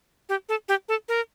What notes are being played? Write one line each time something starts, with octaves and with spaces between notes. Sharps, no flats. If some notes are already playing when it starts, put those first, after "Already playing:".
G4
A4
G4
A4
A#4